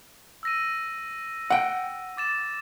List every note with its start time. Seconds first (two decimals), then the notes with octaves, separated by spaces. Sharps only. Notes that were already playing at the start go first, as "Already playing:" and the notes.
0.43 E6 A#6 D#7
1.50 F#5 G5
2.17 D6 A6 E7